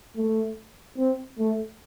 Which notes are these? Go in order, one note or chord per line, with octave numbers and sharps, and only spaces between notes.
A3
C4
A3